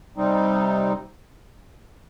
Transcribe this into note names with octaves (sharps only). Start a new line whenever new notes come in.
C3 G3 C4 D#4